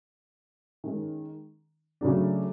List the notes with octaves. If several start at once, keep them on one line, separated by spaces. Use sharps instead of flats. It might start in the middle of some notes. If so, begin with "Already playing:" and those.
D#3 G#3 C#4
C#3 F#3 A3 D4